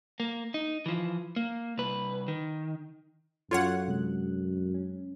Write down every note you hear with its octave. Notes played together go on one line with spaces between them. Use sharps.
A#3
D#4
E3 F3
A#3
C2 B4
D#3
F#2 F4 A4 C#5 F#5
C3 G#3 F#6
C#4